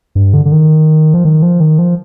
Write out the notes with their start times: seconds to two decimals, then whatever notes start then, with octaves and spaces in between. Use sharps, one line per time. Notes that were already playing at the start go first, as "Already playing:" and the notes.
0.15 G2
0.34 D3
0.45 D3
0.52 D#3
1.14 F3
1.25 D#3
1.42 F3
1.60 D#3
1.79 F3